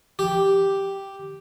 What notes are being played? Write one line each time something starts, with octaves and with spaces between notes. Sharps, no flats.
G4